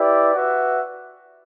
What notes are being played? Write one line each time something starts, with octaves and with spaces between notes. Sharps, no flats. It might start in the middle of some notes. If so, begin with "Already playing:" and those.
Already playing: E4 G4 B4 D5
F#4 B4 E5